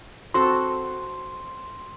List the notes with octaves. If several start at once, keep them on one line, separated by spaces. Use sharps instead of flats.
C4 F#4 A4 C6